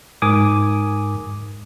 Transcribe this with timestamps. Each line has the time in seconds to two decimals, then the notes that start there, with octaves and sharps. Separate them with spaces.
0.22 G#2 A#4 G#5 D6 D#6